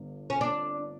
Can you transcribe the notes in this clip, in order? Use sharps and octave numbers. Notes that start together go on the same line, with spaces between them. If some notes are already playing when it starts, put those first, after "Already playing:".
Already playing: G1 G2 D3
C#4
D4